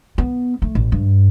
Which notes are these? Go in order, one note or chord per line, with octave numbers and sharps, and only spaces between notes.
B3
A3
A1
G2